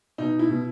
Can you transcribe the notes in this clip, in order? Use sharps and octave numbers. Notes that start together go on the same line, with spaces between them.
B2 D#4
E4
B2